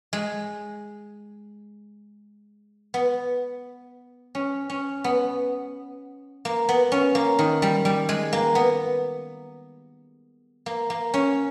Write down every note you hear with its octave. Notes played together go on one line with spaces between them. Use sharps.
G#3
B3
C#4
C#4
B3
A#3
B3
C#4
A#3
D#3
G3
G3
G#3
A#3
B3
A#3
A#3
C#4